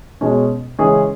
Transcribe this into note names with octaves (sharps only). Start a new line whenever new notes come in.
B2 G#3 C#4
C#3 E3 G#3 C#4 G#4